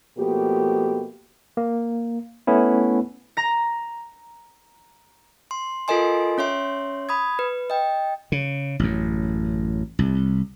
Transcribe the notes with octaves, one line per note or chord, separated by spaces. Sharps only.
B2 F3 A3 A#3 G4
A#3
A3 B3 C#4 E4
A#5 A#6
C6
F4 A4 A#4 D#5 G#5 C6
C#4 C#5 E5 C6
B5 D#6 G#6
B4
D#5 G5
C#3
A1 F#2
C2